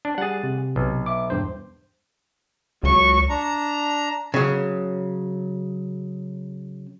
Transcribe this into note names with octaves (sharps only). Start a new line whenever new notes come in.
D4
G3 G#4 F#5 A6
C3
B1
E5 D6
E2 G2 C5
C#2 F#3 C#6
D4 A#5
C#3 F#3